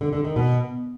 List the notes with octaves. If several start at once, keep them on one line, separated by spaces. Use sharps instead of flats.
D3
D3
D#3
B2